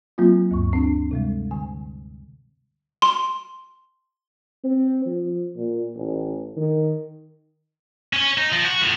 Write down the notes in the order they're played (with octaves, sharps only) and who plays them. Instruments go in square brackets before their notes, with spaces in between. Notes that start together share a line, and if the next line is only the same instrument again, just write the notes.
[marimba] F#3 A#3 C4 F4
D2 G2 C#6
C4 D4
C3 G3 G#3
D3 G#5
[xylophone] C6
[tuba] C4
F3
A#2
A1
D#3
[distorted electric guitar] C#4 C#5
D#4
F3
F#4
A2 F3